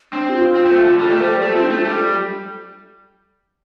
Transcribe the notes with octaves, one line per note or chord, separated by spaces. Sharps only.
C4 D4
G4
F4
C4
C4
A3
D3
G3 A4
A3
G3 C5
A3 A4
C4 F4
D4
A3 F4
G3 A4